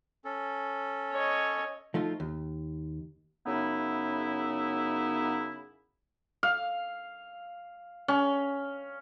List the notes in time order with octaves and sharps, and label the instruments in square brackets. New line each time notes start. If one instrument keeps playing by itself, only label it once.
[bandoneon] C#4 A4
[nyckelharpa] C#5 D#5
[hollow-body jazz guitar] F3 A3 D#4 F4
D#2
[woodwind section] F#2 C#3 B3 D#4 E4
[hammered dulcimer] F5
C#4